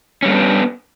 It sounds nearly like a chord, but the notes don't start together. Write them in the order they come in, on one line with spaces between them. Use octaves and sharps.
C#4 G3 A#3 D4 B3